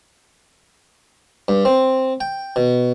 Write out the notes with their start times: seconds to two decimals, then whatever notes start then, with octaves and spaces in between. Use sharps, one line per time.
1.48 G2
1.65 C4
2.20 G5
2.56 B2